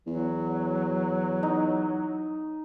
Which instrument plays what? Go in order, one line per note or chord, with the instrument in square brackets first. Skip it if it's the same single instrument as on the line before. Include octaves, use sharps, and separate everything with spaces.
[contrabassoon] E2 [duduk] F#3
[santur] D#4